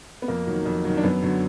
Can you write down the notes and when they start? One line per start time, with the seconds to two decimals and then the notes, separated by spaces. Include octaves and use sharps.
0.22 B3
0.28 F2 A#3
0.47 D#3 F#3
0.65 F2
0.84 D#3 F#3
0.97 D4
1.03 F#2 B3
1.22 D3 F#3